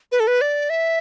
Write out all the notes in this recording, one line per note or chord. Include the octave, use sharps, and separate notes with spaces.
B4
A4
B4
D5
E5